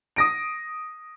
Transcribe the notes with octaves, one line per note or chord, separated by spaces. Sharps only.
D#6 A#6 D7